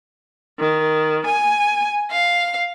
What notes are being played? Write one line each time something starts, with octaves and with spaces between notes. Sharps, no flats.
D#3
G#5
F5